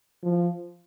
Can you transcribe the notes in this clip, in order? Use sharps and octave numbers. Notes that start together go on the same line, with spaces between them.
F3